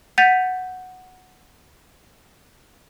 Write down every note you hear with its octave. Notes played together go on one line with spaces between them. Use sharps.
F#5 G6 A6 B6 D#7 F7